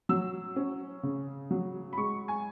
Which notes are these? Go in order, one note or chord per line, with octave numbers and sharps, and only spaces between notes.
F#3 E6
C#4
C#3
F#3
B5
G#3 C#6
G#5